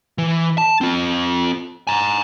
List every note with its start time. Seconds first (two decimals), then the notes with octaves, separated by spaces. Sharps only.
0.18 E3
0.58 A5
0.81 C4 F4
1.87 G#5 A#5